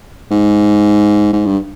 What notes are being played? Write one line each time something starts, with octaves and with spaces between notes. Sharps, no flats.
G#2
G#2
G2